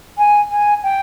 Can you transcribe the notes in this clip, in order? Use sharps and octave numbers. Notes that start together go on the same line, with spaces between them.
G#5
G#5
G5